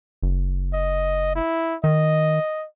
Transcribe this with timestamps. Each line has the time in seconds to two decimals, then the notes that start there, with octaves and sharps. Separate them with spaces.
0.22 F#1
0.73 D#5
1.35 E4
1.84 D#3 D#5